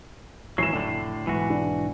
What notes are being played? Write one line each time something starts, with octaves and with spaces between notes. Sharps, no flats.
G#1 E3 F#3 C7 E7
F1 A2 D3 D4
B1 G#2 E3 F#4
D4